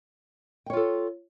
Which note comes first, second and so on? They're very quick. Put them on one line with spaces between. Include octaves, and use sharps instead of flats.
G5 C#5 F4 A4